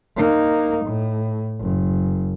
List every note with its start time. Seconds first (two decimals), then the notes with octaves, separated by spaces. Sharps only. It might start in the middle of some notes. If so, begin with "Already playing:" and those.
0.16 A#3 D#4
0.85 A2
1.60 F#1